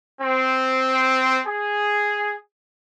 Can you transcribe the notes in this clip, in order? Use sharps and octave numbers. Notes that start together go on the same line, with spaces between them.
C4
G#4